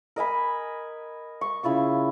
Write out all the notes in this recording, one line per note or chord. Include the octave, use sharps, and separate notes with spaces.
A#4 D#5 G#5 B5
C#6
C#3 E4 F4 C#6